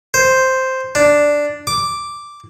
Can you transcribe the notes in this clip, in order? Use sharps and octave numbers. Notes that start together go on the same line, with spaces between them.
C5
D4
D6